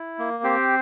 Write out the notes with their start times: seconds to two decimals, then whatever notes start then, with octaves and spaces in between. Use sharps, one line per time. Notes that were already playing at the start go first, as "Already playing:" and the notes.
Already playing: E4
0.19 A#3
0.44 C4 G4 C5